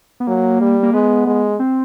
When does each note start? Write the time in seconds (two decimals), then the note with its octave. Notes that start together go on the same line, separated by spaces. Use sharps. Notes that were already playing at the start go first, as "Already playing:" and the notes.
0.20 B3
0.27 F#3 A#3
0.61 G3
0.83 A#3
0.94 G#3 B3
1.27 G#3
1.59 C4